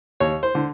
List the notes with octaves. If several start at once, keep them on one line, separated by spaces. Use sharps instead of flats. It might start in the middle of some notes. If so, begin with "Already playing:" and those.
D#2 C#5
C5
D3